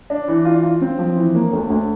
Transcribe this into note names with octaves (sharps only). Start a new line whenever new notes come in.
D4
E3
F4
F4
C4
F3
E3
A#3
D2
D2